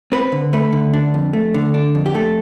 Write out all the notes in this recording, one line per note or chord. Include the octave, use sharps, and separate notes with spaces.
C4 B4
D3
A3 B4
D3
D4
F2
A3
D3
D4
F2
G4
A3 A4